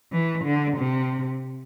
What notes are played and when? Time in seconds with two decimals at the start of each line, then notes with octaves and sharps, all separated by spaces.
0.12 E3
0.44 D3
0.77 C3